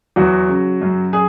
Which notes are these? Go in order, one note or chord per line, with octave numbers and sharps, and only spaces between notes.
E2 F#3 F#4
C#3
F#2
G#4